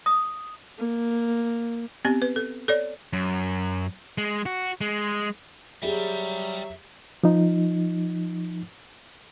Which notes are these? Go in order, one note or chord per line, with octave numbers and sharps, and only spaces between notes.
D#6
A#3
B3 C4 G4
B4
A4
A4 C#5 D5
F#2
G#3
F#4
G#3
F#3 G3 G4 G#4 E5
F3 D#4